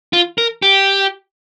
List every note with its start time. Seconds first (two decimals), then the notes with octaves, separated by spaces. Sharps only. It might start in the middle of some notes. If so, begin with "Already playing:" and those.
0.13 F4
0.38 A#4
0.62 G4